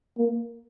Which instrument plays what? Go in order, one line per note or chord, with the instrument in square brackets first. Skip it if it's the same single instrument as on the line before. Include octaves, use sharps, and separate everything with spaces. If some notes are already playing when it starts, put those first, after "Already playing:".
[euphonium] A#3